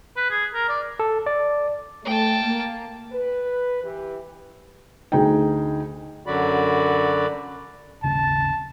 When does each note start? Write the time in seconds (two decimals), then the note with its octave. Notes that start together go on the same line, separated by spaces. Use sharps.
0.16 B4
0.30 G#4
0.54 A#4
0.69 D5
1.00 A4
1.26 D5
2.05 A3 G5 A5
2.44 A#3
3.12 B4
3.84 E3 G4
5.12 D2 D#4 G#4 G5
6.27 F#2 D3 F#3 F#4 D5 B5
8.03 D#1 G#1 C#3 A5